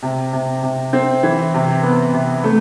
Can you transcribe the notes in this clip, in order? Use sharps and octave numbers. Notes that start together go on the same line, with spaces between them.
C3
C3
C3
C4
E3
C3
B3
C3
A3